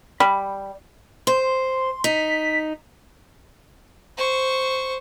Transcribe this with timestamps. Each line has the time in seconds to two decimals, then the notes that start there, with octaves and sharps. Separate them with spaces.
0.20 G3 B5
1.27 C5 C6
2.04 D#4 B6
4.17 C5 C#6